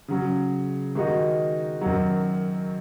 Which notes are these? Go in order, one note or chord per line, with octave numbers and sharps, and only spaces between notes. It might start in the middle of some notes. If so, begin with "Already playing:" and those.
C#3 F#3 C#4
D#3 G#3 D#4 F#4
F#2 D#3 F#3